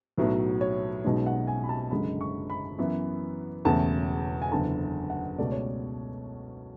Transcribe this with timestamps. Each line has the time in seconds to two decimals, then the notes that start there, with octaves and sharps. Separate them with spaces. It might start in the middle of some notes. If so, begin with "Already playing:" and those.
0.18 B1 A2 F#3 B3
0.61 C#5
1.04 B1 B2 G#3 C#4
1.26 F#5
1.47 G#5
1.64 B5
1.69 A5
1.91 F#1 F#2 D3 G#3 B5
2.21 C#6
2.50 B5
2.79 F#2 E3 B3
3.65 E1 E2 C#3 E3 A3 A5
4.42 G#5
4.51 F#1 E2 D3 A5
5.10 F#5
5.38 C#2 B2 A3 D5
5.52 C#5